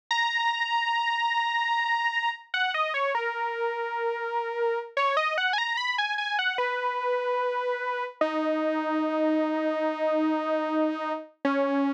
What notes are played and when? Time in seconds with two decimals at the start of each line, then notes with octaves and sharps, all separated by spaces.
0.11 A#5
2.54 F#5
2.74 D#5
2.94 C#5
3.15 A#4
4.97 C#5
5.17 D#5
5.38 F#5
5.53 G#5
5.58 A#5
5.77 B5
5.98 G#5
6.18 G#5
6.39 F#5
6.58 B4
8.21 D#4
11.45 C#4